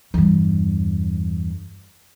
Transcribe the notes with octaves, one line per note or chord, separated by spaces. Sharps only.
E2 G2